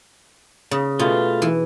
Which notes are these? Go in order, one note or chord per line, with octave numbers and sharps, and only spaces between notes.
C#3
B2 A3 F4
E3